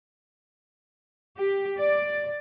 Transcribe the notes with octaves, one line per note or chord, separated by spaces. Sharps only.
G4
D5